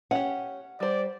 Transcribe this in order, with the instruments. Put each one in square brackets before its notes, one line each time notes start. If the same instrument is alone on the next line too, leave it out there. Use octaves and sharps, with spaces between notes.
[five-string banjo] C#4 G4 [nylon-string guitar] F#5
[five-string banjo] G3 C5 [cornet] D5